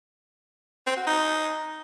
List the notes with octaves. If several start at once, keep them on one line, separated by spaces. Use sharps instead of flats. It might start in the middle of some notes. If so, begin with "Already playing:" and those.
C4
F#4
D#4